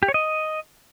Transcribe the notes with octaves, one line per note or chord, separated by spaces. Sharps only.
G4
C#5
D#5